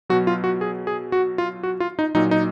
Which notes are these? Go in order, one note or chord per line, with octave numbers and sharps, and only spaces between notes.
B2 F#3 F#4
F4
F#4
G#4
G#4
F#4
F4
F#4
F4
D#4
A#2 F#3 D#4
D#4